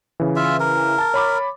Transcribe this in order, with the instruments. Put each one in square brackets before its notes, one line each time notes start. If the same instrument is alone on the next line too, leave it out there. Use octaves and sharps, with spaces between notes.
[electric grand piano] C#3 E3
[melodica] F4 E5
A#4
[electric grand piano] A5 A6
C#5 B5 D6